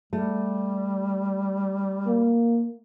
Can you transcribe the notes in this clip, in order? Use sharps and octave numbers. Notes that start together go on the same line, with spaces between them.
G3 A3
A#3